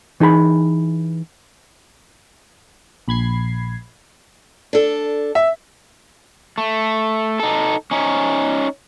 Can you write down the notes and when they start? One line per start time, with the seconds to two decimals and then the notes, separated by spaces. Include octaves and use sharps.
0.20 E3 D#4 G#4 A#5 B5
3.08 A#1 B5 G#6 C7
4.73 D4 A4
5.35 E5
6.58 A3
7.40 D#4 A4
7.91 C#4 D#4